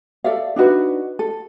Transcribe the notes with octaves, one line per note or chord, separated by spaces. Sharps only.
A4 D5 E5 F5
D4 D#4 F#4 B4
A4